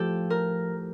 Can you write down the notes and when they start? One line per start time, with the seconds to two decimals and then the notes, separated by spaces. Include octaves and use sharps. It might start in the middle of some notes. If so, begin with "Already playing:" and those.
Already playing: A2 F3 G4 A4
0.30 A#4